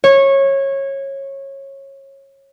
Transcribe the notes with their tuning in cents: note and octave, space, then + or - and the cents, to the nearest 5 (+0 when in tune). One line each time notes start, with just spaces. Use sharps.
C#5 -20